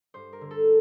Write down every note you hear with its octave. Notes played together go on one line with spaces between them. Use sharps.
G2 C5
A#4
D3
A4